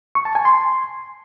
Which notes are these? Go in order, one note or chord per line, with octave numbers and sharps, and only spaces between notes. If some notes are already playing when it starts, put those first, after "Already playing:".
C#6
A5
G#5
C6